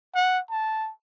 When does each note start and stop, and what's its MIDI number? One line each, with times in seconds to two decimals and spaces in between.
0.15 0.39 78
0.50 0.90 81